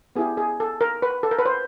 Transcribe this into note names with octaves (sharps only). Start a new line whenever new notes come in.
B3 E4 G4 G#4
G#4
A4
A#4
B4
A4
A#4
B4
C5